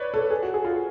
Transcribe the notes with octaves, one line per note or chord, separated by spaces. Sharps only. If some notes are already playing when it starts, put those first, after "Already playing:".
Already playing: B4 C#5 D5
A4
G#4
F#4
G#4
F4